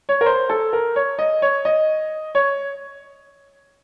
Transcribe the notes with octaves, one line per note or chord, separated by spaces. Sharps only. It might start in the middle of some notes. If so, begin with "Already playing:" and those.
C#5
A#4
C5
A4
A#4
C#5
D#5
C#5
D#5
C#5